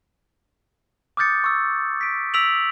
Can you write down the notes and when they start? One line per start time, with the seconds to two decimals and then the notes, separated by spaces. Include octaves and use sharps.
1.17 D6 D#6 F6 G6 A6 C#7
1.44 C#6 E6
2.01 B6 D7
2.34 E6 B6 D7 F7 F#7